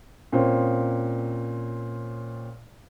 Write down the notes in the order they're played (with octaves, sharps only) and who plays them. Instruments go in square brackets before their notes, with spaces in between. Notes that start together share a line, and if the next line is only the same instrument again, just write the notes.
[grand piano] A#2 C4 C#4